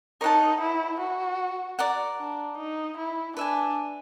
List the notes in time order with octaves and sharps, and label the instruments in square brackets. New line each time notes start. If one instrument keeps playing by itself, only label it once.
[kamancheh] D#4 [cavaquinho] A#4 C#5 F#5 A5
[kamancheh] E4
F#4
[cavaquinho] A#4 D5 F#5
[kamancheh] D4
D#4
E4
[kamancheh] D4 [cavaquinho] B4 E5 G#5